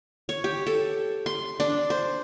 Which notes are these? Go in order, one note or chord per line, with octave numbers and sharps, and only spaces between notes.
C#5
G4
A4
C6
D4
C5